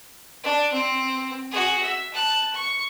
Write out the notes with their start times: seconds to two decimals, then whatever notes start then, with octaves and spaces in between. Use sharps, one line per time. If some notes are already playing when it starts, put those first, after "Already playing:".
0.44 D4
0.72 C4
1.51 F#4 G#4
1.82 E5
2.14 A5 F#6
2.53 C#6